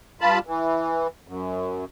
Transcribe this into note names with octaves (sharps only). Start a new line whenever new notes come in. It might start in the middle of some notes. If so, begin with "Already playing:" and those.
G2 F4 A5 B5
E3
F#2